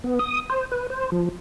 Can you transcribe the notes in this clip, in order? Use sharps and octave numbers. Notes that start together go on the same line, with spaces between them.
B3
D#6
C5
B4
C5
F3